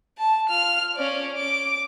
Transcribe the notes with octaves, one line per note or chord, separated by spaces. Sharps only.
A5
F4 F6
C#4 D5
D6